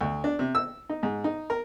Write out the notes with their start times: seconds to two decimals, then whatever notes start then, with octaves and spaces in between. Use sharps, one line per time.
0.01 D2
0.24 D4
0.39 C3
0.55 E6
0.89 D#4
1.03 G#2
1.24 D#4
1.50 A#4